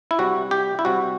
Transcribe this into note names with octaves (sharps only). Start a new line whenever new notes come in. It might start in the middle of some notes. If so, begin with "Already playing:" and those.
E4
C3 G3 F#4
G4
E4
C3 G3 F#4